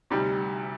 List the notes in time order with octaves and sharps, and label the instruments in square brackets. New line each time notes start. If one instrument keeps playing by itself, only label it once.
[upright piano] D2 C3 G3 D#4 G4